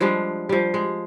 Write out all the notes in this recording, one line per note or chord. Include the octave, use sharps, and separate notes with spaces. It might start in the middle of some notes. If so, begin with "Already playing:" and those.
F3 G3 G#3 D4
F3 G3
G#3